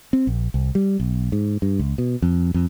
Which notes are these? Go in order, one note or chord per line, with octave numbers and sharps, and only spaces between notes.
C4
A#1
C2
G3
B1
G#2
G2
C#2
B2
F2
F2